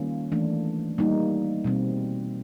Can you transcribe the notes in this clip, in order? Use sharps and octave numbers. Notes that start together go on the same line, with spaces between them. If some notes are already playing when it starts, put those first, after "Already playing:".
Already playing: D#3 G3 A#3 C#4 F4
E3 A3 D4
G3 A#3 D#4
B2 G3 C4